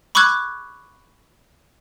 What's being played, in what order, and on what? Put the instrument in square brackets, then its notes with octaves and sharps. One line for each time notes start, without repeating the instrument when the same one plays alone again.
[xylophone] B5 C#6 D6 E6 F#6 G#6